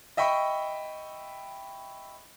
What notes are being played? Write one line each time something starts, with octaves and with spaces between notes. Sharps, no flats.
D#5 E5 G5 B5 C#6